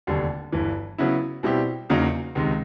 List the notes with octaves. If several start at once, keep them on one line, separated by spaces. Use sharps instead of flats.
F1 D#2 D3 G3
G1 G2 E3
C#3 F#3 B3 E4
B2 G3 C4 E4 G4
E2 C#3 F#3 A#3 D#4
C#2 C3 D#3 G#3